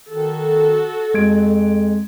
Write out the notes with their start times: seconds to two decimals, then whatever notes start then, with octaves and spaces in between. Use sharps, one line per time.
0.10 D#3 F#4 A4
1.14 F2 G#3 G#6 D7